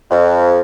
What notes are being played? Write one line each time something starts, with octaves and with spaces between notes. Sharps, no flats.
F2